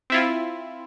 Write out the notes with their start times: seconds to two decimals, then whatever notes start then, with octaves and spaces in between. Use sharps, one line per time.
0.10 C4 E4 F4